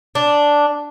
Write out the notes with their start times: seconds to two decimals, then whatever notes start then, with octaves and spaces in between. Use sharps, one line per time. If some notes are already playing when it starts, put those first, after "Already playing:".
0.15 D4